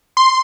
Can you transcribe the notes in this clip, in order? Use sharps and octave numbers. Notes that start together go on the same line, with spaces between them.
C6